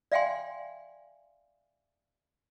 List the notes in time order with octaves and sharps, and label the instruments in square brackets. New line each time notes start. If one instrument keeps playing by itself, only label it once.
[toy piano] D5 E5 F5 G5 G#5 C6